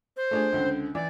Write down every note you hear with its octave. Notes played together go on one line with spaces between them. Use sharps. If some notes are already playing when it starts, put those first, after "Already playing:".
C5
A3 D4 G#4
C#2 D3
E3 D5